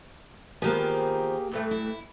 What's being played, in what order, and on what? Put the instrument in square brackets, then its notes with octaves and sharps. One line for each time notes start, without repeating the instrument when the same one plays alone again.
[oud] D#3 F3 B3 [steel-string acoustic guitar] A#3 G4 G#4
[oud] G2 E3 A3
[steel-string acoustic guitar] E4